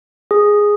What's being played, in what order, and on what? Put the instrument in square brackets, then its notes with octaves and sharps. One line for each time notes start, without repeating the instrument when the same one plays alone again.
[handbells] G#4